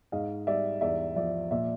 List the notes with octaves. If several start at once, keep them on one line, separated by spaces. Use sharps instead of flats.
G#2 D#5 F5
G3 D5 E5
E2 D5 E5
F3 D5 E5
A#2 D5 E5